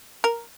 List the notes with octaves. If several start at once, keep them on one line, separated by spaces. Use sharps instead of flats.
A#4